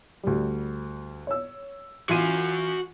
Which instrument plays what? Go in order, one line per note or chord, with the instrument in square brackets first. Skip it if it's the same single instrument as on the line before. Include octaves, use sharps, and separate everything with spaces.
[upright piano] D2 G3
C#5 E6
[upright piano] E3 F4 D#7 [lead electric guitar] F#4 G#5